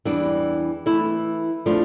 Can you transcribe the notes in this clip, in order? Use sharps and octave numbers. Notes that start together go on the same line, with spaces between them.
E2 E3 G3 D4
E3 A3 E4
F3 A3 D4 F4